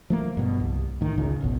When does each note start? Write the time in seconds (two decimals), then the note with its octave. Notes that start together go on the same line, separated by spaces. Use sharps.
0.10 F3 A3 A#3
0.37 G2 B2
0.60 C2
1.01 A2 D#3
1.18 C#2 C#3
1.41 D1 G#1 B2